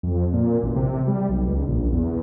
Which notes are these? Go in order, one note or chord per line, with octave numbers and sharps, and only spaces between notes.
F2
A#2
A1
C3
G3
B1
C#2
A#1
E2